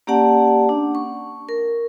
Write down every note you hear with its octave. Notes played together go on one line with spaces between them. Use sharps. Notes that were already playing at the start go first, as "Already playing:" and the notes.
A#3 C#4 G4 D5 F#5 A5
D4
C#6
A#4